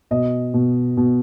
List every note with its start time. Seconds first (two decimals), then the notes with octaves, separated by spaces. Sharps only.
0.11 B2 D#5
0.54 B2
0.97 B2